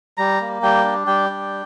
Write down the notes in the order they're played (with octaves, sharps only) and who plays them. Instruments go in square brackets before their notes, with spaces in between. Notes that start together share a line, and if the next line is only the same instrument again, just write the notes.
[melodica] G3 A#5
A#3
G3 G5
D4
G3 G5
D4